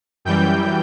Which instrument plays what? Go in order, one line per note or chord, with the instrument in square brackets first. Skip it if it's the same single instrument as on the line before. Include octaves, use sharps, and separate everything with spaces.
[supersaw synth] F#2 E3 G3 G5 G6